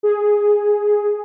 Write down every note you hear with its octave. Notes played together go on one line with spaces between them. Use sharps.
G#4